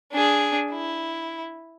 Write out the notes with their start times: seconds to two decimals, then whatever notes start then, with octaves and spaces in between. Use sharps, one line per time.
0.12 D4 G#4
0.72 E4